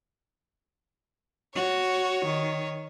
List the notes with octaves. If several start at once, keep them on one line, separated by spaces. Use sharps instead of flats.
F#4 C#5
D#3